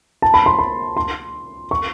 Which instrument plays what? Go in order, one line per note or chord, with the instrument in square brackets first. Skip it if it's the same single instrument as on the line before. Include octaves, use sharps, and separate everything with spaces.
[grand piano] A5
B5
C6
B5
C6
C#6